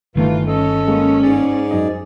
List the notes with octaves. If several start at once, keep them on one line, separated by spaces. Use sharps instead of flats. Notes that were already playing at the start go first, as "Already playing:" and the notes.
G1 D#3 E3 A3 F4
C#4 A4 D#5
G#3 A#3
G#2 G#4 D5
F#2 D#4 D#5